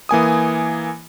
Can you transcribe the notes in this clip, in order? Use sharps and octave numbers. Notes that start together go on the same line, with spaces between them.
E3 A#3 G#5 D#6